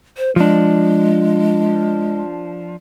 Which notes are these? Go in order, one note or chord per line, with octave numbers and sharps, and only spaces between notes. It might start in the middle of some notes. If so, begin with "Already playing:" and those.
C5
F3 G#3 D4